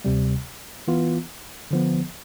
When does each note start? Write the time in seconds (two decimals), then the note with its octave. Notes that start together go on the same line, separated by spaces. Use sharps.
0.04 D2 C3 G3
0.88 E3 B3 F4
1.71 D3 F3 B3